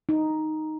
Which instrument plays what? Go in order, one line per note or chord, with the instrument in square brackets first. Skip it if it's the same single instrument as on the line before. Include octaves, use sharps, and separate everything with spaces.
[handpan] D#4